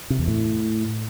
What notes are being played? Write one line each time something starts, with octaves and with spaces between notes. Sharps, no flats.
C3
E2
A2